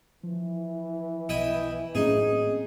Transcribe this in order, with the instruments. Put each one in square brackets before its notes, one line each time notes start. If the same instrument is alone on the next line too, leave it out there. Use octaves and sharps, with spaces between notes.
[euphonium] E3 [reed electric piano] F3
[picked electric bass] B1 [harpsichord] E4 D#5 G5
[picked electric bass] A2 F#3 A#3 [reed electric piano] C4 C#4 [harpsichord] D#4 G#4